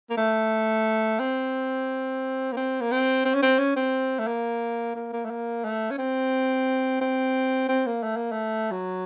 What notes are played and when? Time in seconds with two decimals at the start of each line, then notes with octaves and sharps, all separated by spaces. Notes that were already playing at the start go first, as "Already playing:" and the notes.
0.10 A#3
0.17 A3
1.20 C4
2.52 A#3
2.57 C4
2.81 A#3
2.92 C4
3.25 C4
3.34 C#4
3.42 C4
3.59 C#4
3.76 C4
4.19 A3
4.27 A#3
4.95 A#3
5.13 A#3
5.25 A3
5.30 A#3
5.65 A3
5.91 C#4
5.98 C4
7.01 C4
7.69 C4
7.86 A#3
8.03 A3
8.17 A#3
8.32 A3
8.71 F#3